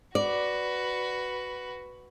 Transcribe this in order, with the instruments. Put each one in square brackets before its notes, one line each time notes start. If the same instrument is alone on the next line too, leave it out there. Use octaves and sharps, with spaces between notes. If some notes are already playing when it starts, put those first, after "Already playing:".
[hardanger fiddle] F#4 B4 [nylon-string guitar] D5